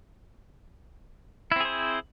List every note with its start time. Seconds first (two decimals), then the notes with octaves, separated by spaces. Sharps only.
1.52 E4
1.56 C4
1.60 G#4
1.65 C5